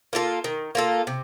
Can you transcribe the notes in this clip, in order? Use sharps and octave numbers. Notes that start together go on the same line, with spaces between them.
A#3 F4 A4
D#3
A#3 F4 A4
C3